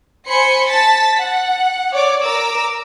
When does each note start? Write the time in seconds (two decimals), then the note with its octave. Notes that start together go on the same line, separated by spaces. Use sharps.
0.27 C5 G#5 B5 C6 C#7
0.68 A5 A6 B6
1.18 F#5
1.93 C#5 D5 D6
2.23 A#4 D6 E6